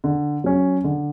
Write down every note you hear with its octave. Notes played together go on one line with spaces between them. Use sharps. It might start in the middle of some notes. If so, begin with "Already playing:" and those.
D3
F#3 C#4
D3